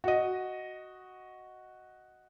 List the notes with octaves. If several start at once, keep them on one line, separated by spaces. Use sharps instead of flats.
F#4 D#5